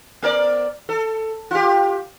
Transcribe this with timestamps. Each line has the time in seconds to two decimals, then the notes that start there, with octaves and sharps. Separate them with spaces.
0.22 B3 A#4 D5
0.89 A4
1.51 F4 G4